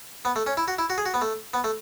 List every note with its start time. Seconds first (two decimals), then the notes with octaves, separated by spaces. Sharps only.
0.25 B3
0.36 A3
0.46 C#4
0.57 E4
0.68 F#4
0.79 E4
0.90 F#4
0.98 G#4
1.06 F#4
1.14 B3
1.22 A3
1.54 B3
1.64 A3